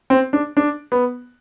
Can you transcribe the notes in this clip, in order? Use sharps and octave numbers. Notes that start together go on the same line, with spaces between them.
C4
D4
D4
B3